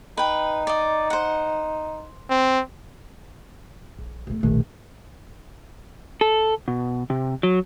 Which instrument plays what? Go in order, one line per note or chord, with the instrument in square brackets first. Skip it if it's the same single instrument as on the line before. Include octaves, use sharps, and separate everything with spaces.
[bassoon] D#4 [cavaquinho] B4 G5
[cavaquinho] D5 D#5
C5 F#5
[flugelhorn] C4
[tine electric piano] A#1
[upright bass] E1 A3
[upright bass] F1 A#1 [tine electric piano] B2 D#3 A3
[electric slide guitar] A4
B2
C3
F#3